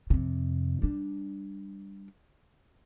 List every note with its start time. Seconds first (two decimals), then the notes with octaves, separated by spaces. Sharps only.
0.10 F2 C3
0.82 G3 D4